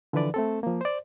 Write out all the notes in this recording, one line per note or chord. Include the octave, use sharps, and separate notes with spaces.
D3 E3 F3 B4 D5
A3 C4 A4
F3 A#3
C5 D5